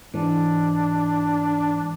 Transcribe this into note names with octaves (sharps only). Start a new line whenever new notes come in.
G#2 E3 D4